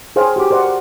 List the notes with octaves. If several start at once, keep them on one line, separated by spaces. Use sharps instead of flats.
G#4 C5 C#5 F5 G5
F#4 G4 D6
A#4 C5 D5 F#5